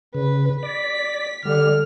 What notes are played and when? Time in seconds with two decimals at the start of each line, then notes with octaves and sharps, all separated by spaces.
0.15 C#3 B4
0.63 D5 B6
1.45 D3 G3 F6